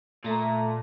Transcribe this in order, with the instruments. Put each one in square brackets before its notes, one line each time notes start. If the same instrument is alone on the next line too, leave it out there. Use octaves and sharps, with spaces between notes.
[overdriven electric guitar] A#2 [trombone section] A3 [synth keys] A5 A#5